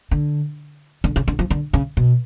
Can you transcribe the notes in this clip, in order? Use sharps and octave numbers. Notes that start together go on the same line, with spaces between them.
D3
D3
C#3
D3
F3
D3
C#3
B2